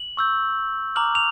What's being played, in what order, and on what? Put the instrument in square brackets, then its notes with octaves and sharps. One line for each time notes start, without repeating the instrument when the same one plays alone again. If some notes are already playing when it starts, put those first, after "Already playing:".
Already playing: [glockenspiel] F#7
C#6 E6 G6
A#5 D6 F6 F#7
F7